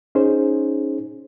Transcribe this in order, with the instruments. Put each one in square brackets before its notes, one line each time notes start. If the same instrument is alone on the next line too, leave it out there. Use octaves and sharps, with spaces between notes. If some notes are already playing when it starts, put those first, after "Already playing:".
[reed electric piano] C#4 D#4 G#4 C5